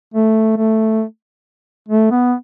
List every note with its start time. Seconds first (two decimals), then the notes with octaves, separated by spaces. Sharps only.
0.14 A3
0.58 A3
1.89 A3
2.11 B3